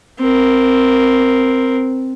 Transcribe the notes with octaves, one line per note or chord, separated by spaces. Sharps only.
C4 A#4